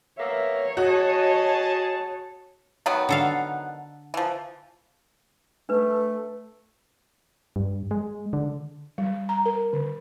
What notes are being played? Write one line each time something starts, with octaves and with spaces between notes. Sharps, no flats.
A#3 B3 C#5 E5
F#4 G#4 D#5 A5
D#3 F#3 B3
D3 A4 F5
E3 F3
A3 D4 B4
G2
G#3
D3
G3
A#5
A#4
D3